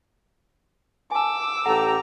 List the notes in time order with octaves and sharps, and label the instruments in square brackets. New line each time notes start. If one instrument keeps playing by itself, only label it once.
[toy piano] G#5 A5 [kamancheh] D6 E6
[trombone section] A1 G4 A4 [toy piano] F#5 [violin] A#5